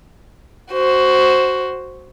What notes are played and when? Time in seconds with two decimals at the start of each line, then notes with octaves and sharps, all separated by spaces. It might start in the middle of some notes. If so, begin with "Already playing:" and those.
0.73 F#4 C5